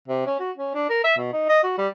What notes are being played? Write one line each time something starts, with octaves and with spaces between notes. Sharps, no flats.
C3
C#4
F#4
C#4
D4
A#4
E5
B2
D#4
D#5
F#4
G3